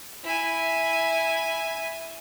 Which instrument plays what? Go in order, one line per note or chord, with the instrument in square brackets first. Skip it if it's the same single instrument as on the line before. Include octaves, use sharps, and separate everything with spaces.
[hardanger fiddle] E4 G#5